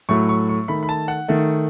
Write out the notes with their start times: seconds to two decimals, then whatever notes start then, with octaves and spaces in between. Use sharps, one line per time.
0.09 A2 F#3 A3 C#6
0.29 C#6
0.49 C#6
0.68 D#3 A3 B5
0.83 B5
0.89 A5
1.08 F#5
1.28 D#3 A3